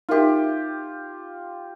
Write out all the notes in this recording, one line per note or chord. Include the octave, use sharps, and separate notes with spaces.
D#4 F4 G4 A#4 E5